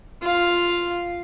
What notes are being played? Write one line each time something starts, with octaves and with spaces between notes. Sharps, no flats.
F4 F5